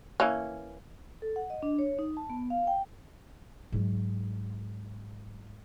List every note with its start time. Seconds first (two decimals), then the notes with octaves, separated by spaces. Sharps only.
0.20 E3 A#3 C#4
1.22 A4
1.36 F#5
1.50 D#5
1.62 D4
1.79 C#5
1.99 D#4
2.17 A5
2.30 B3
2.50 F5
2.67 G5
3.72 G#2 F#3